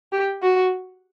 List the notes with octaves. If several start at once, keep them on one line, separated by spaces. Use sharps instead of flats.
G4
F#4